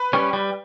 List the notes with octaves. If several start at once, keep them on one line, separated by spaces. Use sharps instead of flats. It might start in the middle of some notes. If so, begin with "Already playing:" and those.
Already playing: B4
G3 C#4
G3